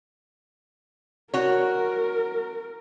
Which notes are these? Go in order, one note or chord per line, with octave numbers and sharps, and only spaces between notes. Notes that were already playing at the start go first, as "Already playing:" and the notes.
F#4 A#4 C#5